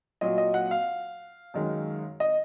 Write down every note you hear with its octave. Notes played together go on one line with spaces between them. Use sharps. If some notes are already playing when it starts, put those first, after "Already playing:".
A#2 F#3 D#5
D#5
F#5
F5
F#2 D#3 G#3
D#5